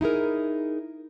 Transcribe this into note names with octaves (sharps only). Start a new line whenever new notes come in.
D#4 E4 G#4 A#4